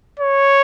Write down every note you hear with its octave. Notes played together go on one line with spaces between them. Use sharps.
C#5